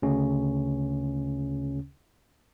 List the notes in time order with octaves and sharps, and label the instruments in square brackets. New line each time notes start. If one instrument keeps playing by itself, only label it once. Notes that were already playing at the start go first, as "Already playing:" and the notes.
[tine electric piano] D2 C#3 C#4